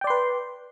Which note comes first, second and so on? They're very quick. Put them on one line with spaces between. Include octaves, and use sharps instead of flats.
G5 D5 C6 B4